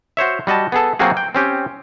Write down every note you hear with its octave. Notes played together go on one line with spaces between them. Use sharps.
F#4 C5 C#5 E5
G3 F#4 D#5 A5
B3 G#4 A4
F#3 A#3 C4 F4 F#4 G#4
G5
C4 C#4 G4